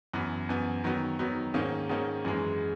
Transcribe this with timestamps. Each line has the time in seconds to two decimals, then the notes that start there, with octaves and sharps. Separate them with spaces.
0.14 F#2 E3 B3
0.49 F#2 E3 B3
0.84 D#3 F#3 B3
1.19 D#3 F#3 B3
1.54 G#2 D#3 A#3 C#4
1.89 G#2 D#3 A#3 C#4
2.25 F#2 E3 G#3